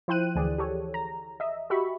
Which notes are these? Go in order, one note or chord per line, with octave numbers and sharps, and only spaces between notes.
F3 E4 C5 G5 F#6 D#7
D2 E3 G#4 D5
G4 A4 C#5
A#5
D#5 E5
F#4 G4 E5 B5 C#6